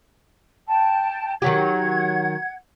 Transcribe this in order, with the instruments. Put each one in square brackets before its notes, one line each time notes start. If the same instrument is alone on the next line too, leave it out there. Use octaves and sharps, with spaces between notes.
[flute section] G5 A5
[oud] D#3 F#3 G4 [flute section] F#5 G#6